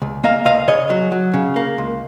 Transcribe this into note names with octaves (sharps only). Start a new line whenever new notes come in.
C#2
A#3 D#5 F5
C#2 D#5 F5
C#3 C#5 D#5
F#3
F#3
C#3
A#3
C#2